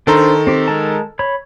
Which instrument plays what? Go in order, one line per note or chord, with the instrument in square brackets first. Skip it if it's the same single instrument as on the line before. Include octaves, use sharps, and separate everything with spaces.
[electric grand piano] D#3 A4 A#5 [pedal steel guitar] D4 C5 C6
[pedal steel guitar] C4 G4
G#3 A#4 A5
C#5 B5